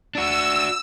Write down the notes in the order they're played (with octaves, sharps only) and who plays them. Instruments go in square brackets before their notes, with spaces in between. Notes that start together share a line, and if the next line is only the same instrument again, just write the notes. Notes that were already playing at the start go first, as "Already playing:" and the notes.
[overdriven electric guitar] D4 F#4 [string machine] E6